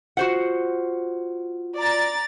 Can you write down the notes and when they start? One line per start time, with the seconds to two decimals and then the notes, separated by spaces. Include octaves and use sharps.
0.17 F4 F#4 C5 F#5
1.77 D5 A#5 A6